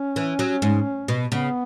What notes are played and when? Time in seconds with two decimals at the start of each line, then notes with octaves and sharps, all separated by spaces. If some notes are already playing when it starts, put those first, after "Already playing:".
Already playing: C#4
0.16 E3
0.39 F#3
0.62 G#2
1.08 B2
1.32 C#3 B3